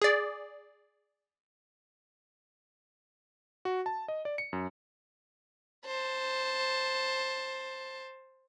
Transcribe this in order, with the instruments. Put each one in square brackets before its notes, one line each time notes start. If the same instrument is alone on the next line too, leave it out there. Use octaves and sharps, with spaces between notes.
[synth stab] G#4 D5
[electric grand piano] F#4
A5
D#5
D5
C#7
F#2
[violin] C5 A5